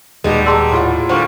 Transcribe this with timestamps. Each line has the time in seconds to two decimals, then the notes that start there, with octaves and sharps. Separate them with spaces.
0.24 D#1 B2 G3 G#3 D#4
0.46 G#4 D5 A5 A#5 C6 E6
0.71 A2 F4 F#5
1.09 A#2 D3 G3 C5 C#6 F6